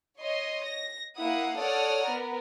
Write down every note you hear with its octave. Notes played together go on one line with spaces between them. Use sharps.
C#5 D#5 C6
A#6
A#3 E4 F5 F#5 D#6
A4 C#5 D5 F#5 D#6 F6
B3 A#4